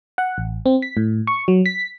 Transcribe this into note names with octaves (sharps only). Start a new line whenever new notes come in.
F#5
A1
C4
B6
A2
C#6
F#3
B6